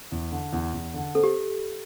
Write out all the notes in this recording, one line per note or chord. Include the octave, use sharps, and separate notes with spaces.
E2
D3
E2
E2
D3
C4 A4
G4